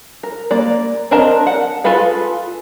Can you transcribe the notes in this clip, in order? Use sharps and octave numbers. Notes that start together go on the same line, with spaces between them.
A#4
A#3 D5
C4 D4 A#4 D#5 A5
F#5
F4 G#4 A4 B4 F5